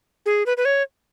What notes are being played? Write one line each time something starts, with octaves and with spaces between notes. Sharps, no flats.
G#4
B4
B4
C#5